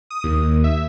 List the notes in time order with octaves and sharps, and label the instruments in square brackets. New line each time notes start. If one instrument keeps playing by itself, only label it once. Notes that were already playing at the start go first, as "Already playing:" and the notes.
[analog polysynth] D#6
D#2
E5